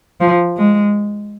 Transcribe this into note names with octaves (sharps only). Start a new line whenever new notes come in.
F3
G#3